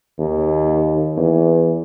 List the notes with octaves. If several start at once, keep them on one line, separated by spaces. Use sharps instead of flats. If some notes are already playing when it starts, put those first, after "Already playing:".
D#2
E2